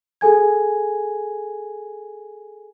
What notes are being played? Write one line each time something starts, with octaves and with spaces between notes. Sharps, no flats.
G#4 A4 G#5 G#6